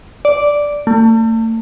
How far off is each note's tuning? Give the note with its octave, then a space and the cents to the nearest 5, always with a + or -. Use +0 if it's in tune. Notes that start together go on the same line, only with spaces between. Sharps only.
D5 -5
A3 +40